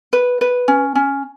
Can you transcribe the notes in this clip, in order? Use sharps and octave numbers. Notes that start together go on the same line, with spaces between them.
B4
B4
C#4
C#4